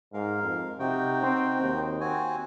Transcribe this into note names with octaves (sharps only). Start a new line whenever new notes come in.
G#2 A#4 F5
F2
C3 D#4 F#4 G5
C4
D#2
C4 F#4 G#5